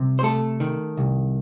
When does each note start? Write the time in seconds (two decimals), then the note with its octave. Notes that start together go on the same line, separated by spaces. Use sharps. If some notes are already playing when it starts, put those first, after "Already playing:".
Already playing: C2 C3
0.19 C5
0.23 A3 A4
0.60 D#3
0.97 C2